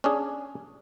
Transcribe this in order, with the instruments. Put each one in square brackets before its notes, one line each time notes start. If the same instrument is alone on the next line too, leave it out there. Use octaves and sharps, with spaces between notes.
[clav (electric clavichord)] C#4 D4 G#4